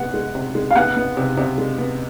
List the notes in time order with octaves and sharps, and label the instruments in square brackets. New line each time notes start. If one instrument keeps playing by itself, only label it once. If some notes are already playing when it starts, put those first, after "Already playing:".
Already playing: [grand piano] C3 G#3 B3 [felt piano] F#5
[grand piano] G#3
C3
G#3
[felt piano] F5
[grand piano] B3 [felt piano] F#5
[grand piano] B3
C3
C3
G#3
B3